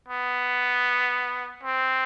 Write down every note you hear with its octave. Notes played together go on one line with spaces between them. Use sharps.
B3
C4